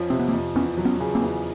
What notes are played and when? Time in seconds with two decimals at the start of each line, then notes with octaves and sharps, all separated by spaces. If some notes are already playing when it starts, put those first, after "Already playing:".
Already playing: F2 F3 C#4
0.10 C3 C4
0.20 B3
0.28 A#3 C4
0.33 F2
0.56 E2 B3 C#4
0.77 F#3
0.85 B3 C#4
1.00 C#3
1.15 A#3 C4
1.22 E2